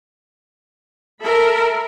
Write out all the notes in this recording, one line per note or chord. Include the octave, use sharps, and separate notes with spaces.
A4 A#4 E5 B5